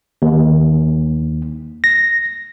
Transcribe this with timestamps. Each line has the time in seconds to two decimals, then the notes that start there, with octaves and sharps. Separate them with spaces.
0.22 D#2
1.84 A#6